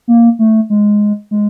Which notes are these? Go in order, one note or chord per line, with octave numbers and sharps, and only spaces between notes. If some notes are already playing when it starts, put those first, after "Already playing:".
A#3
A3
G#3
G#3